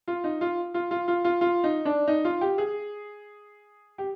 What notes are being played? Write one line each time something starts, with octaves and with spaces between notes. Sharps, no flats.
F4
D#4
F4
F4
F4
F4
F4
F4
D#4
D4
D#4
F4
G4
G#4
G4